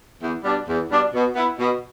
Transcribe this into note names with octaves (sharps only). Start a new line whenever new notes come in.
E2
B2 G3 D4
E2
B2 G3 D4
B2
B3 E4
B2